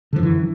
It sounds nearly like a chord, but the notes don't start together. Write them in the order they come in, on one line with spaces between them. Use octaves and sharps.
D3 F3 F#2 E3